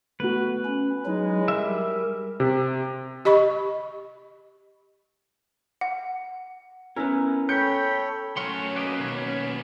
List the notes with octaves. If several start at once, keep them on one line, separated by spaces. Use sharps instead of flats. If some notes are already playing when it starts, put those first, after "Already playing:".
A3 B3 F#4 B4
C#4
F#3 G#3 D#4 E4
G3 A#4 E5
C3
G4 D#5 B5 C#6
F#5
B3 C#4 E4 A#4
A4 C#5 G5 B5 G6 C#7
F#3 A3 C#4 A#4 C#5 F#5 C6
A#3 B3 B4 D5 D#5
B2 D#3 F#3 C#5
C#4